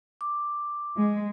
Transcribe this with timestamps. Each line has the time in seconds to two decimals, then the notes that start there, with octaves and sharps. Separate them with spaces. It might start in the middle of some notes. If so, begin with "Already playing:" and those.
0.21 D6
0.97 G#3